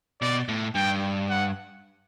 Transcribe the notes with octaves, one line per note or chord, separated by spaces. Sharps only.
B2 D5
A2
G2 G5
F#5